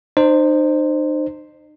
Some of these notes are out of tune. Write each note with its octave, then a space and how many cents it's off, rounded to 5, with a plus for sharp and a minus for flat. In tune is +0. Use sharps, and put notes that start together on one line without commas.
D#4 -40 C5 +0